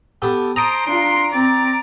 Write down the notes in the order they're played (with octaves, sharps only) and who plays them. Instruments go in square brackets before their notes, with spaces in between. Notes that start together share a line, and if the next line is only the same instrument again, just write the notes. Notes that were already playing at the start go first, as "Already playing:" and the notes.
[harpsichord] B3 G4 A4
[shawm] C5 [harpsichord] A5 D#6 [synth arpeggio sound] A#5 D7
[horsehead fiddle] D4 F4 [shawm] C6
[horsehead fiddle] C4 [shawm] D5